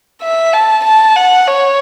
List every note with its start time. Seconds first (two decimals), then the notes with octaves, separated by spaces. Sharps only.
0.22 E5
0.53 A5
0.84 A5
1.16 F#5
1.47 C#5